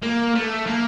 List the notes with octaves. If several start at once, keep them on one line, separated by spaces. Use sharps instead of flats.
A#3
A3
A#3